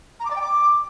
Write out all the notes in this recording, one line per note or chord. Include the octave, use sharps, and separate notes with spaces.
A#5
D6
D5
G5
D6